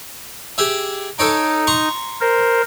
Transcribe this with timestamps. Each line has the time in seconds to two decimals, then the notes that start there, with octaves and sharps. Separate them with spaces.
0.58 G4 G#4 E5
1.19 D#4 A4 C#5 G5
1.67 A#5 C6 C#6
2.21 A#4 C5